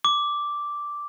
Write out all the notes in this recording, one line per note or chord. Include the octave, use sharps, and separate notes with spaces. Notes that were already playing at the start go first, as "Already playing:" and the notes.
D6